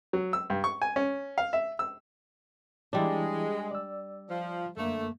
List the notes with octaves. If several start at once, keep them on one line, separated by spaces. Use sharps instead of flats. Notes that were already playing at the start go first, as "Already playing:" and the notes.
F#3
E6
G2
C#6
G#5
C#4
F5
E5
E6
E3 G3 G#3 D4 E4
D5 E6
F3
F#2 D3 A3 A#3